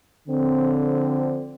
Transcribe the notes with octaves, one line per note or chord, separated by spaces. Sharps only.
D3 F3 C4